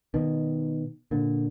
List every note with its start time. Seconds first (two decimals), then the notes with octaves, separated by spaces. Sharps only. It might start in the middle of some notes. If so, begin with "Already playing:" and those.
0.14 B2 D#3
1.11 A#2 D3